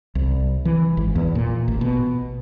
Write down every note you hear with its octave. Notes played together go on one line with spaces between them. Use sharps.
C2
E3
G#1
E2
A#2
A1
B2